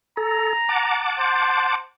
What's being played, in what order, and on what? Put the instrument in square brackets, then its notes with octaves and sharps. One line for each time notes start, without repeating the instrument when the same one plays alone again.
[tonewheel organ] A4 [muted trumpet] A#5
[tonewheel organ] F#5 A5 D6
[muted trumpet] C5